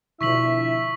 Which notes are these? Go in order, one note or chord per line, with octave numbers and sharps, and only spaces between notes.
B2 D3 F3 E4 E5 C#6 B6 F#7